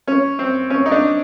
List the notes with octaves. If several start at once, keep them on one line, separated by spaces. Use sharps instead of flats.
C#4
C4
C#4
D#4
D4